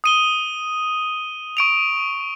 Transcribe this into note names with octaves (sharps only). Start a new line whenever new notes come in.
D#6 D#7 G7
C#6 D7 F7